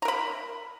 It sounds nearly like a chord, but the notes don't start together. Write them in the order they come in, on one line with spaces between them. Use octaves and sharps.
A#5 A#4 B5